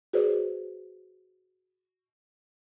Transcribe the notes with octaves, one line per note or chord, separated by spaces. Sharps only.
F#4 G#4 B4 C5 D5